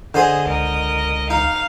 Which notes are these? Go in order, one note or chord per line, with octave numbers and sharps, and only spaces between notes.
D3 G#4 C5 D#5 G#5
C#2 A#4 D#5
D#4 F5